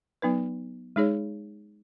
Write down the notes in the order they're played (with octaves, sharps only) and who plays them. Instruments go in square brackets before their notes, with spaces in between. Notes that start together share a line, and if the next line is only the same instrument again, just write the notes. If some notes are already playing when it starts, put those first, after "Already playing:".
[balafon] F#3 B3 D#4 B4
G#3 D#4 G#4 C#5